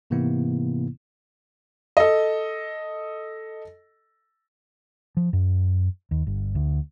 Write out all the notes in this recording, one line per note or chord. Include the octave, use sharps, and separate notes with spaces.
G#2 C3 E3 A#3 B3 E4
A4 D#5
F3
F#2
D#2
G1
D2